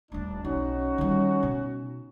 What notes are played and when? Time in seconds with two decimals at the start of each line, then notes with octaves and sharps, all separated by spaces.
0.12 D#1 A3 D4
0.45 B1 C#4 D#4 F#4
0.98 D#3 G3
1.43 B2